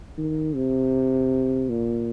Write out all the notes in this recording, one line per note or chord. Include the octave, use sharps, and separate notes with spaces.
D#3
C3
A#2